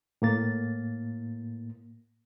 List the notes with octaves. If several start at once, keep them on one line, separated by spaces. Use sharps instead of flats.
A2 A#3 A6